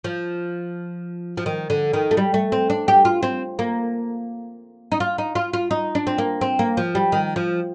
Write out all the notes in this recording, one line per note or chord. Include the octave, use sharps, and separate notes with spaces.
F3
F3
D#3
D3
D#3
A3
G3
A3
C4
D4
G4
F4
C4
A#3
D#4
F4
D#4
F4
F4
D#4
D4
C4
A#3
C4
A#3
F3
G3
D#3
F3